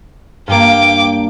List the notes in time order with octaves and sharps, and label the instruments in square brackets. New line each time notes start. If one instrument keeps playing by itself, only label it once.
[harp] G2 A#3 [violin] G5 D6